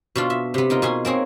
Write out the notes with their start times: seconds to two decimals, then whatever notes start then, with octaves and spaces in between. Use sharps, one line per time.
0.16 B2 D4 F4
0.30 E5
0.54 C3 B3
0.70 A#3 D#4 F4
0.82 B2 G#4 G#5 C6
1.05 A#3 C4 G#4 C#5